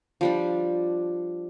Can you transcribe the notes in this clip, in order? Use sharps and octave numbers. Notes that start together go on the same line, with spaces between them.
F3 G3 D4